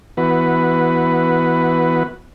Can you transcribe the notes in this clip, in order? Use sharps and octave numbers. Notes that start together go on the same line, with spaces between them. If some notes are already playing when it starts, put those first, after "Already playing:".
E3 B3 F#4 B4